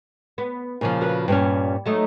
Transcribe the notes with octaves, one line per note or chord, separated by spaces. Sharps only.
B3
A#2 C#3 F3
F#4 A#4 B4
G2 A#2 G3 C#4
F#3 A3 D#4